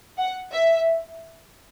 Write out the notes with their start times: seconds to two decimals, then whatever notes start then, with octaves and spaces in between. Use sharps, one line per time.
0.18 F#5
0.52 E5